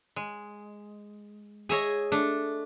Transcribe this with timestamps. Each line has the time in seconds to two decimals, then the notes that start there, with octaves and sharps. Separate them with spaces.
0.16 G#3
1.69 G#4 C#5 D#5 E5 G#5
2.12 A3 D4